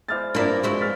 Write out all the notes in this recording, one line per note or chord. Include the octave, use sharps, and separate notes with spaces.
G#3 E4 C5 D5 F6 A6
G2 C3 F3 A#3 C4 E4 F4 D5
G#3 E4 F#4
E3 F6 A6 B6